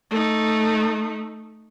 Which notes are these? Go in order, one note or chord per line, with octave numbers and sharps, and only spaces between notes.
A3 D#4